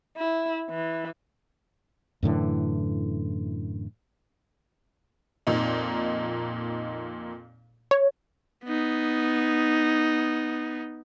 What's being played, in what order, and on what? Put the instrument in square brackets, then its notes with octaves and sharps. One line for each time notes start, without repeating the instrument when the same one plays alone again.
[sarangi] E4
E3
[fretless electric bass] F#2 A2 D3 E3
[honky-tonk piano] F2 A#2 D#4
[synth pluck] C#5
[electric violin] B3 D#4